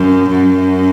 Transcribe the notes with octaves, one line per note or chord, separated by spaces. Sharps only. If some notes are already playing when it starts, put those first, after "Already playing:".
Already playing: F#2
F#2